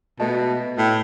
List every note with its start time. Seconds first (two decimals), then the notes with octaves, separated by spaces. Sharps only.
0.20 B2 A3 D#5 A5
0.78 A2